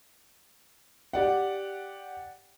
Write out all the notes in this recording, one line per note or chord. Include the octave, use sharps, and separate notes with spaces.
G4 D5 F#5